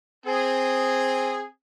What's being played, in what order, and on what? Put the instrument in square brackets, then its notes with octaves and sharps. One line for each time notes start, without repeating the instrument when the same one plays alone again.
[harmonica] C4 [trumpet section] G#4